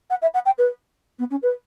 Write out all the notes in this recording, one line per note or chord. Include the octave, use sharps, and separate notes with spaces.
F#5
E5
F#5
G5
B4
B3
C#4
B4